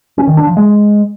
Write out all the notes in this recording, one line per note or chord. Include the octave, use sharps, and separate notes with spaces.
C#4
D#3
D4
F3
G#3